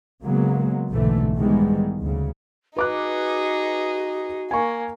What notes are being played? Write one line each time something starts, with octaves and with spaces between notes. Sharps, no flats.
C#3 F#3 G#3 A#3 B3
F#1 B1 G#2 D3 E3 A3
G#2 D#3 E3 G3 G#3 B3
D2 C#3
D#4 F#4 G#4 B4 D6 F#6
A#3 G#5 C#6